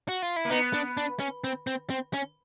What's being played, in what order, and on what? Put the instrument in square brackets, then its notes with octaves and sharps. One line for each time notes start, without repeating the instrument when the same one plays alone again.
[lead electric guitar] F#4
F4
E4
[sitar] A#3
[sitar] B3 [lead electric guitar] D#4
[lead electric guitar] D4
D4
C#4
C4
C4
C4
C#4